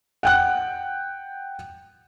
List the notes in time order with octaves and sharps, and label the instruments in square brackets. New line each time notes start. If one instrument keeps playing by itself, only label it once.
[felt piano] F#5 G5 F#6